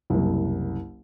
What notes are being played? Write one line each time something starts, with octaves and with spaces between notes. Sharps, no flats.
F#1 C2